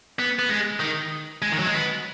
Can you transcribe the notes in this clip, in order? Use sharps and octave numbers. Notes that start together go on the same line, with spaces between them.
B3
B3
G#3
D#3
G#3
D#3
F#3
G#3
B3